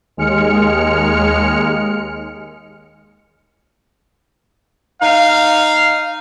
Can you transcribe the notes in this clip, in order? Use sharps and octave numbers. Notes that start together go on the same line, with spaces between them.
D#2 G#3 F6 C#7
D#4 F5